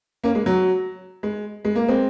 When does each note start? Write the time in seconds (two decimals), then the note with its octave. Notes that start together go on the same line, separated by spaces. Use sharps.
0.24 A#3 C#4
0.35 G#3
0.46 F#3
1.23 G#3
1.65 G#3
1.75 A#3
1.89 G#3 C4